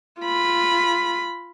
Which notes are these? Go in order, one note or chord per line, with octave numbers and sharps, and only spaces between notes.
F4 B5